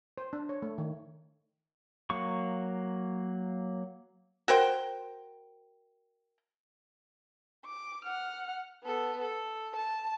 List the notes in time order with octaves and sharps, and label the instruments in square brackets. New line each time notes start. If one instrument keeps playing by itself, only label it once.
[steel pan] C5
D4
C#5
A3
D#3
[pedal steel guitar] F#3 A#3 C#6
[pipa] F#4 A#4 C5 G5
[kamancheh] D6
F#5 F6
B3 A4
A4
A5